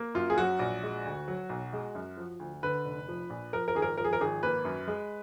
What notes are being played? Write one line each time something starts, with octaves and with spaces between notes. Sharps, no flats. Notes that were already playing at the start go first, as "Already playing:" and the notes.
Already playing: A#3
F#2 F4
G#4
F#3 F#4
A#1
G#3
D2
F#3
B1
G#3
F#2
F3
D2
D3 B4
F1
F3
A#1
F3 A#4
A#4
G#1 G#4
A#4
F3 A#4
G#4
A#4
G#1 G#4
A#3 B4
F#2
G#3